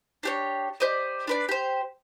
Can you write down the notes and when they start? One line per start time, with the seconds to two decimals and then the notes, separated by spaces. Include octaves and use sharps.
0.23 D4 G4 C#5
0.80 G4 C5 D5 D#5
1.27 D4 B4 D5
1.49 G4 C5